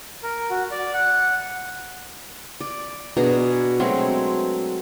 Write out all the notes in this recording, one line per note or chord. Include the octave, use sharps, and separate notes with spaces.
A#4
F#4
D5
F#5
D5
B2 D4 G#4 A#5
F#3 G#3 A3 C4